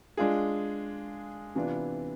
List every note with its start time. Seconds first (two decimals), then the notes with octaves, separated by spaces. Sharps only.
0.17 G#3 D4 F4 G#4
1.55 C3 E3 B3 D4 F4